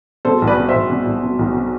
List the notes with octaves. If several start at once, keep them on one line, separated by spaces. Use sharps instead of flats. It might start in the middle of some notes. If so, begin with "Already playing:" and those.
B2 A4 C5
B1
B4 D5
B2
C5 E5
B1
B2
B1
B2
B1
B2